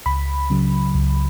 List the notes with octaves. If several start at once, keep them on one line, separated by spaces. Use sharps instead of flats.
C#2 B5
C#3 F#3
C#2